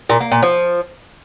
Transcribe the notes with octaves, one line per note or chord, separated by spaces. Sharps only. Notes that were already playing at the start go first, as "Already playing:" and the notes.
A#2
A#3
A#2
F3